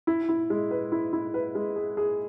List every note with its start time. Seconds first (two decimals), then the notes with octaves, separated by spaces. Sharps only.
0.07 E4
0.29 E4
0.50 G#3
0.71 B4
0.92 E4
1.13 E4
1.34 B4
1.55 G#3
1.76 G#4
1.97 G#4